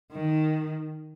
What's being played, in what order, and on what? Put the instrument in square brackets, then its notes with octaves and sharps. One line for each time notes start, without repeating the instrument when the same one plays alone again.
[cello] D#3